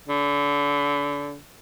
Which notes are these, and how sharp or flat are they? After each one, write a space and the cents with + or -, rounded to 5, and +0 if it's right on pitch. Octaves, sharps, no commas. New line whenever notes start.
D3 -35